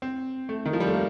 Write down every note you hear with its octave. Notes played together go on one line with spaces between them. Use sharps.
C4
A3
D#3
F3
G3
A3
A#3